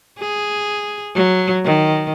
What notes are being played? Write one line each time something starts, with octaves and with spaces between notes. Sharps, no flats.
G#4
F#3
D#3